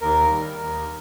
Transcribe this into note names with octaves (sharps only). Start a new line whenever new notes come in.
D#2 A#4
D#3 G3
D#2